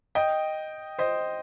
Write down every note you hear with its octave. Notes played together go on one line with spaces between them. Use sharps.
D#5 G5
C5 D#5